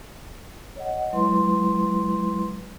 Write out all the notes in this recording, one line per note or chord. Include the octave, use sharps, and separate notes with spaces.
C#5 D#5 F#5
F#3 G#3 E4 B4 C6